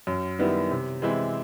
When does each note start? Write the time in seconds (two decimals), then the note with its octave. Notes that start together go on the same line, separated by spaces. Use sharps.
0.07 F#2
0.39 D#3 G3 B3 E4
0.71 C3
1.02 E3 G#3 C4 E4